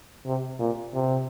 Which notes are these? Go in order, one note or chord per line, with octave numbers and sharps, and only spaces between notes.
C3
A#2
C3